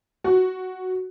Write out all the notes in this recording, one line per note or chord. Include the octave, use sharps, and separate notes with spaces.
F#4